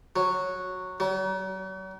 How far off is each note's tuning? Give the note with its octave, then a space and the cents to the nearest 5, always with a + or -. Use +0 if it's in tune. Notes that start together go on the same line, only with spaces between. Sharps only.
F#3 -5
F#3 +45